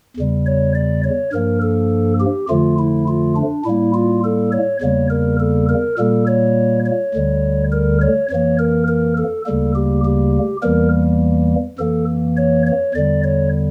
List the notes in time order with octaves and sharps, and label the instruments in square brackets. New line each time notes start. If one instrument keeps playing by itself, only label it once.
[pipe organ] E2 C#3 G3
C#5
D5
C#5
G2 F3 A#3 A#4
A4
G4
F2 D3 F3 A3 F4
E4
F4
D4
A2 G3 A#3 E4
F4
A4
C#5
E2 C#3 G3 A#3 C#5
A#4
A4
A#4
A#2 G3 A#3 A4
C#5
C#5
D2 D3 G3
A#4
C#5
F2 E3 A#3 C#5
A#4
A#4
A4
D2 C#3 G3 A#3 A4
G4
G4
E2 E3 G3 A#3 A#4
F2 E3 A#3 A4
C#5
C#5
E2 D3 G3 D5
C#5